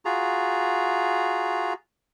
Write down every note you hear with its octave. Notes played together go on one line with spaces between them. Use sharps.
F4 F#4 G#4 A#5